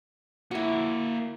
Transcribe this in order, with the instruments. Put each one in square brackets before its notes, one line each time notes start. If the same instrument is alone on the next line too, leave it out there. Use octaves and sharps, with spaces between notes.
[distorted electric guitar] A#3 C#5 [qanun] E4 F#4